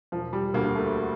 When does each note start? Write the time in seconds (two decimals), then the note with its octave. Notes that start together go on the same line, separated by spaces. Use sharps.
0.12 E1 F3
0.33 G3
0.54 D2 D3 A#3
0.75 A3